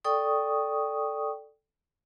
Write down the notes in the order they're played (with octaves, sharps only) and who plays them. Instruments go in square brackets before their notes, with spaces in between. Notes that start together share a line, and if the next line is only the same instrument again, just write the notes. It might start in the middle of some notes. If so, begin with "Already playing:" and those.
[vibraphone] A4 D5 G5 C#6 D#6